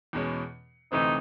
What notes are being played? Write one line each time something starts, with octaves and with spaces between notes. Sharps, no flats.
E2 B2 G#3 C#4
D2 C3 E3 A3 C4 D#4